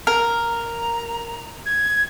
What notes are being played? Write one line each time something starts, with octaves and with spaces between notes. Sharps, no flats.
A#4
A#5
G#6